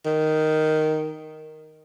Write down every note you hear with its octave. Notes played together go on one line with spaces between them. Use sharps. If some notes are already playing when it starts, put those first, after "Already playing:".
D#3